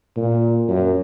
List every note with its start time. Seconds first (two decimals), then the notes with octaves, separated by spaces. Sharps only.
0.17 A#2
0.68 F#2